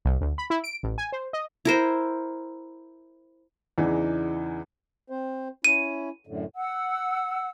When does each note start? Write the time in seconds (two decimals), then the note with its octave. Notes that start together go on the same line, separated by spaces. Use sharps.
0.05 C2
0.21 D2
0.38 B5
0.50 E4
0.64 D7
0.83 A1
0.98 G#5
1.12 C5
1.33 D#5
1.65 E4 A#4 C5
3.78 E2 C#3 E3 D4 D#4
5.10 C4 C5
5.64 C#4 E4 D#7
6.27 F#2 A2 D3
6.55 F#5 E6